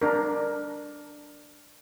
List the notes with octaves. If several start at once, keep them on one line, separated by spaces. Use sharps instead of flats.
D4 A#4